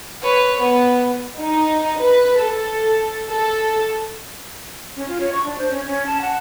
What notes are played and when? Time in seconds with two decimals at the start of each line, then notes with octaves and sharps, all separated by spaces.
0.22 B4 C#5
0.60 B3
1.39 D#4
1.98 B4
2.38 A4
3.29 A4
4.96 C#4
5.08 F4
5.21 C#5
5.32 C#6
5.44 D4
5.58 C5
5.71 C#4
5.87 C#4
6.06 A5
6.22 F#5